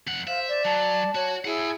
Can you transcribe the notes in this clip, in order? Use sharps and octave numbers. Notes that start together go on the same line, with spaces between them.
F2 F#5
C5 E5 F5
D5
F#3 A5
F#4 C#5
E4 G#4 F#5 G#5